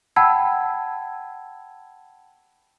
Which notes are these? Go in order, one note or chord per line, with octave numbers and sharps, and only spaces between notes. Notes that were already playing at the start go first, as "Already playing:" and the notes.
F#5 G5 A5 B5 E6 G#6